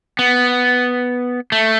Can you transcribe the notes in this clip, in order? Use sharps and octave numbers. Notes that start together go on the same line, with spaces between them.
B3
A3